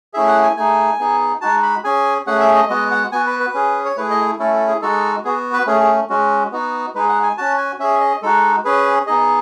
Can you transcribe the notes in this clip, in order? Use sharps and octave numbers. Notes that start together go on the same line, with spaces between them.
A3 C#4 E4 G#4 E5
F#5
G#5
A3 D#4 G#4 G#5
B3 D#4 G#4
G#3 D#4 F#4 A5
B5
C#4 G#4 G#5
A3 C#4 G#4 F#5
E5
D#5
G#3 B3 F#4 D#5
F#5
B3 F#4 G#5
B4
B4
C#4 G#4
C#5
A3 E4 G#4 B4
D#5
A3 C#4 E4 A4
A4
G#4
G#3 D#4 F#4 A4
B3 F#4 G#4
B4
A3 C#4 G#4
G#4
G#3 C#4 F#4
B3 D#4 F#4
G#3 D#4 G#4 B4
F#5
G#5
C#4 F#4 A5
G#5
C#4 G#4 E5
D#5
G#3 D#4 F#4 A4
C#4 G#4 B4
B3 D#4 G#4 D#5